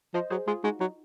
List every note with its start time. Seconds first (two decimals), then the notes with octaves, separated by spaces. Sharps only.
0.14 F3 C5 D#5
0.30 F#3 G#4 C5
0.47 G#3 F4 G#4
0.64 G#3 D#4 F#4
0.80 F#3 D#4